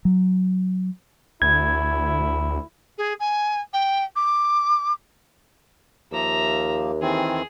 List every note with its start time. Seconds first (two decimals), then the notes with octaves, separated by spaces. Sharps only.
0.05 F#3
1.42 D2 E4 G#6
2.98 G#4
3.20 G#5
3.73 G5
4.16 D6
6.12 D#2 F3 A#3 E5 A#5
7.02 D#3 E3 C4 G#4